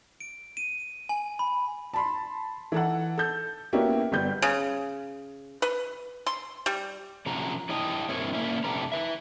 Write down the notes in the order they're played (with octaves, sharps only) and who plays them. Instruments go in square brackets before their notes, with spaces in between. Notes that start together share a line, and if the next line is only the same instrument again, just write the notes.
[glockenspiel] D7
D#7
G#5
B5
[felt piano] A5 B5 C6
E3 A4 F#5
A4 G6
A#3 B3 C#4 E4 F#4 G4
G1 G3 B3 G6
[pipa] C#3
B4
C6
G3
[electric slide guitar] C3 F3 C#4 F#4 A#5
E4 C#5 D#5 G5 A5
G2 C4 E4 A#4 C#5
A#2 A#3 C#4 E4
F2 C3 A3 D4 B4 A#5
B4 E5